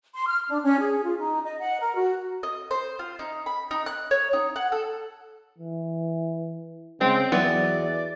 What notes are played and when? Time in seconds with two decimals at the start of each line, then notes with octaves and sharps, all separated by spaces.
0.14 C6
0.27 F6
0.48 D4
0.62 C#4
0.79 G#4
1.04 F4
1.18 D#4
1.43 D#5
1.59 F#5
1.80 A#4
1.95 F#4
2.43 D#5
2.71 C5
2.99 F4
3.19 D#4
3.46 B5
3.71 D#4
3.86 F#6
4.11 C#5
4.33 D#4
4.56 F#5
4.72 A4
5.58 E3
7.01 C#3 G#3 C4
7.32 E2 E3 F#3 B3 D5